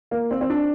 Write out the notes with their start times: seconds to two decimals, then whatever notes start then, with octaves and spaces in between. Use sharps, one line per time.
0.11 A#3
0.31 C4
0.41 C4
0.50 D4